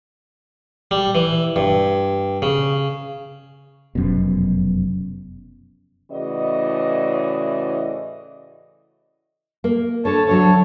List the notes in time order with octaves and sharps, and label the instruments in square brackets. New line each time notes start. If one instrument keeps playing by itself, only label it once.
[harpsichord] G3
E3
G2
C#3
[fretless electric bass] F1 F#2 B2
[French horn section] A2 C#3 E3 F#4 D5 D#5
[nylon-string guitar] A#3
[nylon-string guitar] D3 A4 [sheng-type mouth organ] C#5 A5
[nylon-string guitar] D2 D3 F#3 [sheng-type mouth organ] A4 C#5